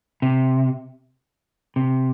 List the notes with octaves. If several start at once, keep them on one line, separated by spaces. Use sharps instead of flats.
C3
C3